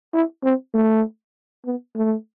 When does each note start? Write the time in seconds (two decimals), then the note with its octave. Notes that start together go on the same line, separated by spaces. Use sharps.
0.14 E4
0.44 C4
0.74 A3
1.65 B3
1.96 A3